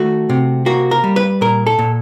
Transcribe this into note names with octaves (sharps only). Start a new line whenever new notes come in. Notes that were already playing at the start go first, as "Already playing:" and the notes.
Already playing: D#3 A3 F#4
C3
A#3 F#4
A#4
G3
B4
A#2 A#4
A4
A#2